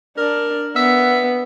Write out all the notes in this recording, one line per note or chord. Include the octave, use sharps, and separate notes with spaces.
D4 A#4
B3 E5